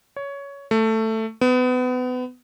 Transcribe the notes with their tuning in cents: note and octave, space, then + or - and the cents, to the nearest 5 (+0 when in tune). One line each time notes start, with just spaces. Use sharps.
C#5 +15
A3 +10
B3 +30